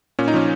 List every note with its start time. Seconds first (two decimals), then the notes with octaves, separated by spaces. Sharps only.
0.19 A#2 C#4
0.28 D#4
0.34 F3 C#4